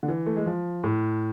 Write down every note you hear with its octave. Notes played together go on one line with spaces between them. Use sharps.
D3
E3
A3
G#3
F3
A2